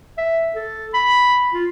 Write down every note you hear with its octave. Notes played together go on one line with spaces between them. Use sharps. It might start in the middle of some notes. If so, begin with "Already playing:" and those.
E5
A4
B5
F4